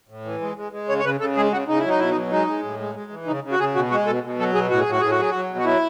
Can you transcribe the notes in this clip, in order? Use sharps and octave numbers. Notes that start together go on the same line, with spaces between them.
A2
E3
G#3
G#3
G#3
C#3 C#5
C#5
C#3 B4
C#3 A4
G#3 G#4
C#3 F#4
C#3 D#4
F#3 E4
D#4
B2 E4
D#4
F#3
G#3 D#4
G#3
A2
G#3
G#3
E3
C#3 D#4
C#3
F#4
C#3 G#4
B2 F#4
G#3 F#4
B2 A4
B2
F#3 A4
B2 G#4
A2 F#4
G#4
A2
F#4
A2 G#4
F#4
F#3 G#4
F#3 F#4
B2
F#4
F#3 E4